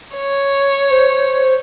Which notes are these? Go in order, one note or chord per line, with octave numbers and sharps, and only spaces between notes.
C#5
C5